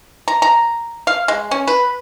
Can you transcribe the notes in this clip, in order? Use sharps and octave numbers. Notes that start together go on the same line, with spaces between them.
A#5
A#5
F5
G#3
C#4
B4